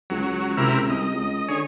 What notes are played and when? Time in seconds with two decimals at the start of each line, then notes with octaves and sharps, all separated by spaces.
0.10 C#2 F#3
0.28 C#2
0.57 C3 E4 A#4
0.90 C2 D#5
1.13 C#2
1.48 D3 G#4 C#5